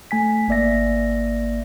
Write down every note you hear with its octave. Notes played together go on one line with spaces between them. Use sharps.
A3 G#5 B6
G#1 A#3 D5 E5 A#6